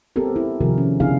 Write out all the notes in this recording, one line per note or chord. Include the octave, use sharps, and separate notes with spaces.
B3 C4 G4 A4 A#4
E4
C3 D#3 F3 F#4 G#4 A#4
C#4
C#3 B3 D4 E4 G#4 F5